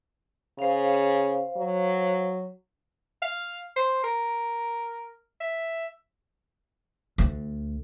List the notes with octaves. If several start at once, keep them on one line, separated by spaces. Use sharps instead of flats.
C#3 C5 F5
F#3
F5
C5
A#4
E5
D2